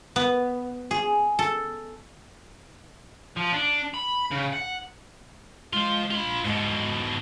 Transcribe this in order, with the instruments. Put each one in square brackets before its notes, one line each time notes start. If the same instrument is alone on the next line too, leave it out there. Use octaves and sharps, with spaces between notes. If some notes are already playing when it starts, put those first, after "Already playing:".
[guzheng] B3
G#4
A4
[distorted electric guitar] F3
D4
B5
C#3
F#5
[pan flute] G#3 [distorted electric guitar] F4 C5
[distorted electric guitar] F4 B5
[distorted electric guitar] G#2 B2 [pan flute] G#3